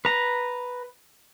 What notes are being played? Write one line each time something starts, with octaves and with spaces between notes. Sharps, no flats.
B4 A#5